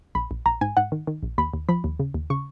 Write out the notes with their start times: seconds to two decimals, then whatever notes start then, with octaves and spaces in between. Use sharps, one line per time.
0.15 A#1 B5
0.31 A#1
0.46 A#1 A#5
0.61 G#2 G#5
0.77 G#2 F#5
0.92 D#3
1.07 D#3
1.23 A#1
1.38 D#2 B5
1.53 D#2
1.69 F3 B5
1.84 D#2
1.99 C#3
2.14 D#2
2.30 C#3 C#6